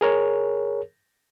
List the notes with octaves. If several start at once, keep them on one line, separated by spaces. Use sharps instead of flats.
G#4 A#4 C#5